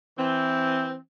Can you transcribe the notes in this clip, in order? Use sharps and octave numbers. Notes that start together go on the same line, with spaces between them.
E3 C4